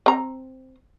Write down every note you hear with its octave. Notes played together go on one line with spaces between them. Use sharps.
C4 A#5